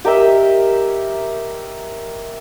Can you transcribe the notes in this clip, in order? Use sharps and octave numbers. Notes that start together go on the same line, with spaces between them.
G4 A#4 D#5 E5